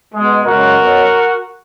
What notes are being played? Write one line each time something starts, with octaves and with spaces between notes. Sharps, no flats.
B2 G#3
F#2 C#3 G#3 F#4 A#4
B2 F#3